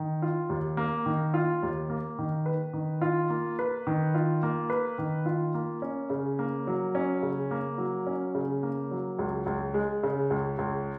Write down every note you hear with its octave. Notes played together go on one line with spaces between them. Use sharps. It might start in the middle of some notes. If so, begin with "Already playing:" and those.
Already playing: D#3
F4
D#2
A#3
D#3
F4
D#2
A#3
D#3
B4
D#3
F4
A#3
B4
D#3
F4
A#3
B4
D#3
F4
A#3
C#4
C#3
A#3
F#3
C#4
C#3
A#3
F#3
C#4
C#3
A#3
F#3
C#2
C#2
G#3
C#3
C#2
C#2